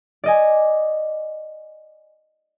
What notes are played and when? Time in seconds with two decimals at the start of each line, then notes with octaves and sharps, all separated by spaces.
0.24 D5 D#5 G#5